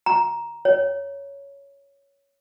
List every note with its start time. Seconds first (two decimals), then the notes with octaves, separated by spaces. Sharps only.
0.06 A#5
0.65 C#5